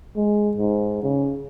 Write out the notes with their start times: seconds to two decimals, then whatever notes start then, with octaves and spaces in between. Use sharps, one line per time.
0.16 G#3
0.57 G#2
1.03 C#3